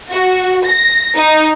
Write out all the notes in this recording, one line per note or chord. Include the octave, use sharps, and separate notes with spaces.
F#4
A#6
D#4